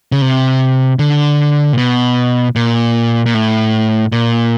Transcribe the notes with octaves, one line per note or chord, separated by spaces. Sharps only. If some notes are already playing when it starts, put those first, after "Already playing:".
C#3
C3
D3
A#2
B2
A#2
A#2
A2
A#2